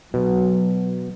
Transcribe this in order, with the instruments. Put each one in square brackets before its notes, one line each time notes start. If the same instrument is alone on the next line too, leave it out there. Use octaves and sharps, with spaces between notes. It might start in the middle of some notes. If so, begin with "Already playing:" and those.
[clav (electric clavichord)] B2 [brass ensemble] F#3